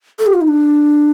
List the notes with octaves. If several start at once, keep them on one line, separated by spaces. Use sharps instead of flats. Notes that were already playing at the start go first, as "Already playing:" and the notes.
A4
G4
F4
D#4
D4